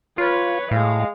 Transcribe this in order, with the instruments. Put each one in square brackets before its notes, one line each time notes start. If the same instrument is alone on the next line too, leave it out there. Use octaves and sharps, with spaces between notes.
[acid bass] F4 [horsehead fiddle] B4 C#5
[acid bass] A2 [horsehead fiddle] G#3 F5